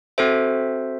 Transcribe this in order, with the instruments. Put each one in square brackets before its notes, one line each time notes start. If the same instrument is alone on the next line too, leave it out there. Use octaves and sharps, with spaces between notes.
[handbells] C4 F#4 A4 C5 E5